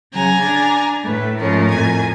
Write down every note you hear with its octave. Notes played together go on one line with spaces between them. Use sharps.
C#3 F#3 G#5 A#5
D4
A2 A3 B4
G#2 F3 A3 C#4 A#4
F2 A2 G#5